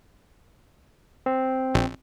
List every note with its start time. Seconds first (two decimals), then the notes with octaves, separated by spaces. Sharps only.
1.26 C4
1.74 A#1